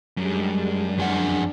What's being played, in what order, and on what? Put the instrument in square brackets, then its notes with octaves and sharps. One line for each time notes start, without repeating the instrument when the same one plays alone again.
[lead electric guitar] F#2 [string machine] G3 G#3 D4
[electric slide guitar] F2 G#4 F#5 [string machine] D4